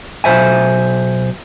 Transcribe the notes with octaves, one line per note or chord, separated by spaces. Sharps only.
B1 A#2 C5 E5 G#5